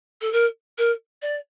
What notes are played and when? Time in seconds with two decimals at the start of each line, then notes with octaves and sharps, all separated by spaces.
0.21 A4
0.32 A#4
0.78 A#4
1.22 D5